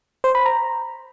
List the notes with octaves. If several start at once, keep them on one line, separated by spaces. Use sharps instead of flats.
C5
B5
A#5